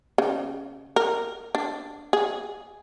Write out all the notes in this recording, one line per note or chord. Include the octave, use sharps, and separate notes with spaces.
C#3
A#4
D4
G#4